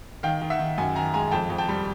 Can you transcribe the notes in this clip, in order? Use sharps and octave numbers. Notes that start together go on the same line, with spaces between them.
D#3 F5 G5
D#3
E5 F#5
D#3
F#2 F#5 G#5
D#3 G#5 A#5
G#3 G#5 A#5
F2 G5 A5
F2
G5 A5
G3